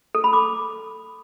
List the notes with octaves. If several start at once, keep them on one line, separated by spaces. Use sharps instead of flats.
A4
B5
D6